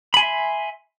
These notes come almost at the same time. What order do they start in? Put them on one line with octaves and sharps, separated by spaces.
B5 G#5 C6 E5